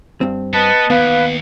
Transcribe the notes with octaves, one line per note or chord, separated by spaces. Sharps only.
G2 C4
B3 B4 D#5 A5
D#2 B3 B4 F5